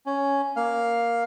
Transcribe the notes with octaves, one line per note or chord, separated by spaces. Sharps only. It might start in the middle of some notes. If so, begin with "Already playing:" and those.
C#4
A#3 F5